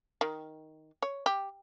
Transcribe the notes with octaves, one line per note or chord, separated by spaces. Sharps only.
D#3
C#5
G4